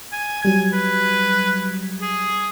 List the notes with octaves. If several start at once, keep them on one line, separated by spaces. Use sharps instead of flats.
G#5
F#3 G3 G#5 G#6
B4
G#4